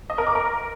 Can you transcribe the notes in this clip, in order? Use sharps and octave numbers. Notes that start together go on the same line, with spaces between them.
D#5
A#4
D6
A#4